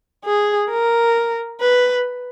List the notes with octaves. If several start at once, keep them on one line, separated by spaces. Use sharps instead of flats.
G#4
A#4
B4